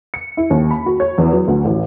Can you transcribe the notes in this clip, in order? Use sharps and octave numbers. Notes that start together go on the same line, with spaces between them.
C#7
E4
D#2
B5
F#4
C#5
E2
F#3
D2
A1